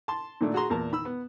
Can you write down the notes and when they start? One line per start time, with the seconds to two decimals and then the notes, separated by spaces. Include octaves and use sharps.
0.08 A5 C6
0.41 A#2 D#3 A3 D4
0.54 F#4 G#4 A#5 C6
0.70 E2 A#2 A#4 A5
0.92 D#3 B5 E6
1.05 B3